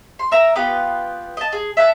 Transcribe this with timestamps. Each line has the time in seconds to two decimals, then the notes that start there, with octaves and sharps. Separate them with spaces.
0.19 C6
0.32 A#4 E5 A#5
0.55 B3 F4 G4 B4
1.37 D#5 A5
1.52 G#4
1.77 E5 F#5 G#5 A5